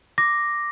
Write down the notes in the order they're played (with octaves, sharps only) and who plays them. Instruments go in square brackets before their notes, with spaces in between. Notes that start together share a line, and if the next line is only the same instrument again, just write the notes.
[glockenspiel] D6 A#6